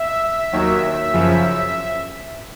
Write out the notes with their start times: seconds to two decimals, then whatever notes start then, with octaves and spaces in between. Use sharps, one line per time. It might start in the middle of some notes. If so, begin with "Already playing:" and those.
Already playing: E5
0.52 D#2 D#3 F#3
1.13 F#2 C#3 F3